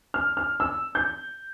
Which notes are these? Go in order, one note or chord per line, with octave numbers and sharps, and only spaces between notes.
F6
F6
E6
G6